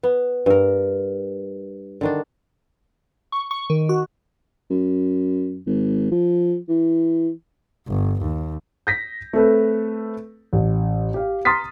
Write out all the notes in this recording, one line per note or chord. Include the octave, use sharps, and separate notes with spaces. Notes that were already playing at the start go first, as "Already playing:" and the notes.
B3
G2 A#4
D3 D#3 D4
C#6
C#6
D#3
F#4
F#2
G#1
F3
E3
G1
D#2
G6 A#6 B6
A3 C4 A4 B4
A1
G4 F5
A#5 C6 D#6 F6 A6 B6